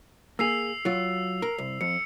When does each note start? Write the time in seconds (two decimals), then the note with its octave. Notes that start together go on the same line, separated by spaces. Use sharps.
0.39 A#3 G#4 E6 C7 F7
0.85 F#3 F4
1.42 A#4
1.58 C2
1.81 F2 C#7